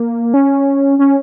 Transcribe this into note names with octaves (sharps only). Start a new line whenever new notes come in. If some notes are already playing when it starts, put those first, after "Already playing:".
Already playing: A#3
C#4
C#4